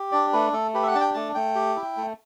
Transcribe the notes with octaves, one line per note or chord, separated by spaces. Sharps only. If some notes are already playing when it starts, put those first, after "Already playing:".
Already playing: G4
D4 D5
A3 B4
A3 A4
G4 B4
E5
F#5
D4 A5
G5
A3 A5
A3 G5
G4
E4
A3